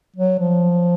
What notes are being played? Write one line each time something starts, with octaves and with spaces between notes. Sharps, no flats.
F#3
F3